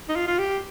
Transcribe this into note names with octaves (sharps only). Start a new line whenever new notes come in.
D#4
F4
F4
G4